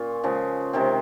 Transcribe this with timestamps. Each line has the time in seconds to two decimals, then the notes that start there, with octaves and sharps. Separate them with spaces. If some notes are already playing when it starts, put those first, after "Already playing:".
Already playing: A#2 C#4 F4
0.24 C#3 F3 G#3
0.73 C3 D#3 G#3 C4